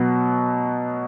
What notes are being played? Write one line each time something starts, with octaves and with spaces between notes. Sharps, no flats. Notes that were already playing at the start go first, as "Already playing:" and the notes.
Already playing: B2 F#3 B3